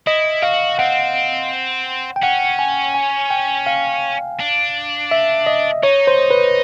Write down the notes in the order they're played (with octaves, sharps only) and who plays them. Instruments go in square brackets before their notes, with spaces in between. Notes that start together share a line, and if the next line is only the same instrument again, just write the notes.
[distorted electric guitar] E4 [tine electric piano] D#5
[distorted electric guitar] F#4 [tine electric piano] F5
[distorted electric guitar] C4 [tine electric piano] F#5
[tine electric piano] G5
[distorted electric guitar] C#4 [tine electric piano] F#5
[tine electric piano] G#5
G#5
G5
F5
[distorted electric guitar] D4
[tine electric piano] E5
D#5
[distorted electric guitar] D#4 [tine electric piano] C#5
[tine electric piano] C5
B4